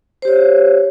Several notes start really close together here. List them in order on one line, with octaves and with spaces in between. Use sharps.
C5 G4 C#5